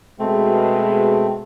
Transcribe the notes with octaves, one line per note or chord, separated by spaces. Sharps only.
B2 G#3 A3 C4